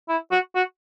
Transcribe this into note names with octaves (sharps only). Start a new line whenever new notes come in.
E4
F#4
F#4